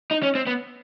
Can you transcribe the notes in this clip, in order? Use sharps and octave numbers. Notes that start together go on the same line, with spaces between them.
D#4
C#4
C4
B3